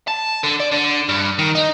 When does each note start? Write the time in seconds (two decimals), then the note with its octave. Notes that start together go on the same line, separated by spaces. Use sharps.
0.08 A5
0.44 D3
0.60 D5
0.72 D3
1.09 G2
1.39 D#3
1.55 D#4